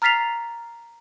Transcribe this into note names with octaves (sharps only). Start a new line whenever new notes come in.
A#5 F6 A6 B6 C7 F7